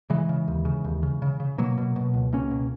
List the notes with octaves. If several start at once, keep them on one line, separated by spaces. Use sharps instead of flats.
C#3 E3 G#3
C#3
D#2
C#3
D#2
C#3
C#3
C#3
B2 F#3 A#3
B2
B2
C#2
C#2 A#3 C#4
B2